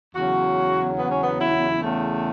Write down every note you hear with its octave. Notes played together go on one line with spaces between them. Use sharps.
E2 C#3 F#3 F#4
B3
C#4
B3
E4
E2 C#3 A3